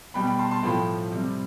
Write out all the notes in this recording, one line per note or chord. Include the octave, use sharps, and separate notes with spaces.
B2 G3 G5 B5
G5 B5
A5 C6
A5 C6
A2 F3 G5 B5
C3 G3